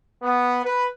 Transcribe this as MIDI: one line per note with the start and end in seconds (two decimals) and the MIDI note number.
0.23 0.61 59
0.65 0.86 71